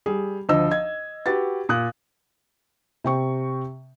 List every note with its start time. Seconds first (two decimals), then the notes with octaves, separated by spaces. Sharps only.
0.06 G3 G#4
0.49 D2 F3 D#5 E6
0.71 D#5 G#6
1.26 F#4 G4 B4 A6
1.69 A#2 D#6 F#6
3.04 C3 G5 C#6